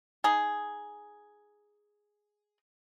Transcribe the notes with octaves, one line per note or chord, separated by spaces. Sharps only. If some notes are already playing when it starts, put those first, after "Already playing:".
D#4 G#4